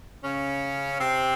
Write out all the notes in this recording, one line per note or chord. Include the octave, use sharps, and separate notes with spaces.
C#3 C#4
C3 C4